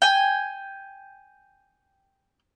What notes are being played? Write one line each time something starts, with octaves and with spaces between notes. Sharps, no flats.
G5 G#5